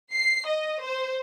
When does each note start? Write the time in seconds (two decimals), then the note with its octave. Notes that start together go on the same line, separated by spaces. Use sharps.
0.13 C7
0.47 D#5
0.83 C5